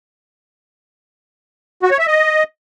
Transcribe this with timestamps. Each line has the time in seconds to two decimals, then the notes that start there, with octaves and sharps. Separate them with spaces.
1.83 F#4
1.91 C#5
1.99 E5
2.07 D#5